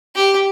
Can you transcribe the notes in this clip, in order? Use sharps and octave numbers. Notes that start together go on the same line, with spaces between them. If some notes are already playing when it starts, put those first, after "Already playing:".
G4